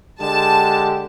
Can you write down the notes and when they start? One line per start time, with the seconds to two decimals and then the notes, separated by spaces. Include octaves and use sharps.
0.21 D3 G#3 G4 A5